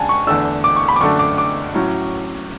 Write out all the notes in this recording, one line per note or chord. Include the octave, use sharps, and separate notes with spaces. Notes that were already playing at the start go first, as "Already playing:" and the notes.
Already playing: C#2 C#3 G#3 D4 G#5 A5
C#6
E2 D3 A3 D4 E6
D6
C#6
B5
D6
F#2 D3 A3 D4 C#6
D6
D6
A2 F#3 C#4